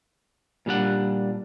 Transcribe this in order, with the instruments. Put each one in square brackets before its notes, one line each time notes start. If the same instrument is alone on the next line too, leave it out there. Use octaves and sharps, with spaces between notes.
[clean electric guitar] A#2 G3 D4 F#5